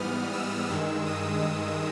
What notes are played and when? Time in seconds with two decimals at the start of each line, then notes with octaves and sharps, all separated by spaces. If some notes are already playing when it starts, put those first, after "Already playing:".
Already playing: G#2 E3 G3 B3 D#6 F6
0.33 E6
0.69 G2 D#3 G#3 E6
1.06 D#6